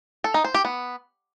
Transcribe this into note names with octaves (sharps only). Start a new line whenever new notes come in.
A4
D#4
C5
G4
B3